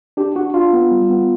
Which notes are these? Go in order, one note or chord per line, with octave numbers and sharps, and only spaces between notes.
D4 G4
D4 F#4
D4 F4
B3
G3
B3